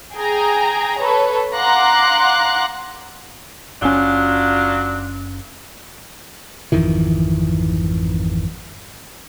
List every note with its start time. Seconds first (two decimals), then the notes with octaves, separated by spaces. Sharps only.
0.15 G#4 G5 G#5 A#5
0.99 A4 B4 C#5
1.55 F5 F#5 A#5 C6 D6 F#6
3.82 F#1 F#3 C#4 D4 F4
6.72 G#1 F2 D#3 E3